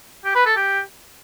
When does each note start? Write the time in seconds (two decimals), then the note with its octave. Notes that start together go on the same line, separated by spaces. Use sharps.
0.24 G4
0.35 B4
0.46 A4
0.56 G4